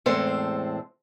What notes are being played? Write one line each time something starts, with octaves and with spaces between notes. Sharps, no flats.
E2 A2 G#3 C4 A4 C5